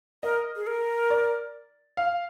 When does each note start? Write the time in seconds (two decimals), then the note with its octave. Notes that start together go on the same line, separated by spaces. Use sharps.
0.23 A#4 D#5
0.56 G#4
0.67 A#4
1.10 D5
1.97 F5